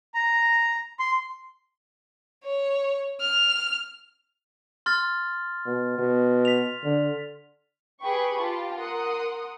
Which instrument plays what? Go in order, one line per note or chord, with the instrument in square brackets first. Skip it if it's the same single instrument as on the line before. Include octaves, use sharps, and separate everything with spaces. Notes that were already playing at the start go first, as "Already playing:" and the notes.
[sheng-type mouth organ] A#5
C6
[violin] C#5
F6
[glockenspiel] C6 F6 A6
[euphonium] B2
B2
[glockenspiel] B6 F7
[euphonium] D3
[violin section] G4 G#4 B4 G5 B5 C#6
F4 G4 A5
A#4 F#5 C6 D#6